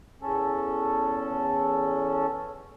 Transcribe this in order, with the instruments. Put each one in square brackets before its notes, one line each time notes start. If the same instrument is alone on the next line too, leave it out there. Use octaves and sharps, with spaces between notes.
[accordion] E2 C#4 A4